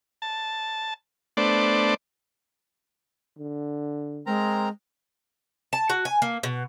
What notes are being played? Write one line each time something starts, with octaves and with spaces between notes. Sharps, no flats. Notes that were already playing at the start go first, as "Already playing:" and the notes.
A5
A3 B3 D4 C5 D5
D3
G#3 C4 A#4 A#5
A5
F#4
G#5
A#3
B2